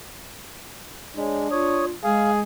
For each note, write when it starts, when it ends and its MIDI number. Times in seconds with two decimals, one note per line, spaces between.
1.16 1.48 56
1.16 1.94 62
1.16 1.39 73
1.52 1.90 65
1.52 1.85 73
1.52 1.85 87
2.04 2.43 56
2.04 2.41 68
2.04 2.31 77